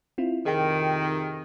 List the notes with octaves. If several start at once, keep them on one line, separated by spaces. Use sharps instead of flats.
C4 E4 F4
F2 C3 D#3 G#4 G5